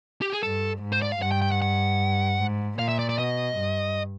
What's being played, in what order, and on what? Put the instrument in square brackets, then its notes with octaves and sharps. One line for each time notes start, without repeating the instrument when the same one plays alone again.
[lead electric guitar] G4
G#4
[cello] G2 [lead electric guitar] A4
[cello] G#2
[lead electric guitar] C5
D5
F5
[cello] G2 [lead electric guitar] F#5
[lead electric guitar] G5
G5
F#5
F#5
[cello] G#2
[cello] A#2 [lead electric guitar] F5
[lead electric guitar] E5
D5
D5
[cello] B2 [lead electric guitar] D#5
[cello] G2